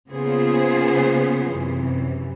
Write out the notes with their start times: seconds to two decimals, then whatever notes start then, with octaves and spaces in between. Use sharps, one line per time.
0.10 C#3 A#3 B3 F4 G#4 C5
1.49 F#2 C3 E3